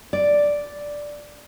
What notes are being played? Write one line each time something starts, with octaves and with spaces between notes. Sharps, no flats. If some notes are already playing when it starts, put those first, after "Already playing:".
D5